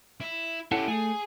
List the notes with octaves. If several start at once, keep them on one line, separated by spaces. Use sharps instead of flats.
E4
C#4 E4 G4 A4 F#5
A3 G#4 G#5